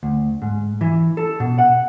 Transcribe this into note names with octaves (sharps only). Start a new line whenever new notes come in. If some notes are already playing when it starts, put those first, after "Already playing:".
D2
G#2
E3
A4
B2
F#5